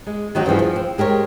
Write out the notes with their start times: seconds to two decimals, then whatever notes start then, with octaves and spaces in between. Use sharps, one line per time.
0.07 G#3
0.35 D#3 F#3 D#4 F#4 G4
0.46 G2 E3 F3 G#4
0.59 F3
0.76 C4
0.98 G#3 G4 A#4 C#5